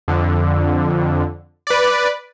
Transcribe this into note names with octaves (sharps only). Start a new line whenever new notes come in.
F2 D3
B4 D5